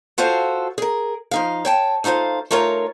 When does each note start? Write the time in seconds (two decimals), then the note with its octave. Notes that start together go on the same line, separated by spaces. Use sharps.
0.18 F4 F#4 A4 C5 F5
0.78 G#4 A#4
1.31 F3 D#4 F5
1.65 C#5 G5 A5
2.04 A3 D#4 F4 C5 F5
2.51 A3 D#4 F4 A#4 C#5